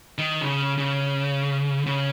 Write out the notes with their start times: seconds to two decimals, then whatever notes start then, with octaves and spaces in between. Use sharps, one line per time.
0.18 D#3
0.41 C#3
0.78 C#3
1.86 C#3